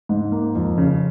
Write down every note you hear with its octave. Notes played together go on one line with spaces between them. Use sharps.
G#2
A#3
F2
C#3